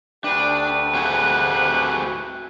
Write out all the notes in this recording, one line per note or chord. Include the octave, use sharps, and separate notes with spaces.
D2 D4 G4 B4
C4 F#4 G#4